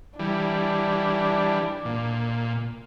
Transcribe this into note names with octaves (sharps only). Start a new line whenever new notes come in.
E3 G3 D4
A#2